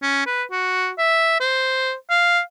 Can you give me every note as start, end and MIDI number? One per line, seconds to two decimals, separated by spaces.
0.02 0.26 61
0.26 0.43 71
0.51 0.90 66
0.98 1.40 76
1.40 1.93 72
2.10 2.40 77